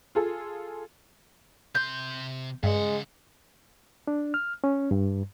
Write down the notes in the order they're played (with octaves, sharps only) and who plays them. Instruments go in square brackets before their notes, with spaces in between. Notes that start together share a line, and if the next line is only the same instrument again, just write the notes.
[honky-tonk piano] F4 G#4 A4
[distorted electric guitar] C3 C6 [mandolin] G6
[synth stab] G2 [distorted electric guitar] C#3 F#5 [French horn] G#3
[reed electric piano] D4
F6
C#4
G2